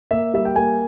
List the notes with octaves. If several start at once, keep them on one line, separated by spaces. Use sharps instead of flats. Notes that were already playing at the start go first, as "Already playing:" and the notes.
A#3 E5
G3 E5
G5
A#3 G#5